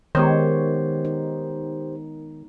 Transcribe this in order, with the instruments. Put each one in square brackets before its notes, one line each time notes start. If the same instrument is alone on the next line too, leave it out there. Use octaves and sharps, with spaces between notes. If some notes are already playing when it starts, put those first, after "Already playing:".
[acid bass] D#3 [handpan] G#3 B3 C#5 [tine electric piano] G4 C5
[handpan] D#4